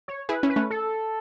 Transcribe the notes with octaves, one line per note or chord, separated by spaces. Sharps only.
C#5
E4 G#4 B4
C#4 E4
B4
A3 C#4
A4